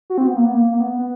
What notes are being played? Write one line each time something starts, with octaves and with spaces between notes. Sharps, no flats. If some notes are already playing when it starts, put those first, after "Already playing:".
F#4
C4
B3
A#3
B3
A#3
A#3
B3
B3